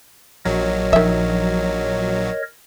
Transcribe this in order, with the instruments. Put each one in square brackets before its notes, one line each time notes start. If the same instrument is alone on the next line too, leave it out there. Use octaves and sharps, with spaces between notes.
[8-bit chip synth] A#1 F#3 [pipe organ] A#4 C#5 D#5
[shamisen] D#3 E5 [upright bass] F3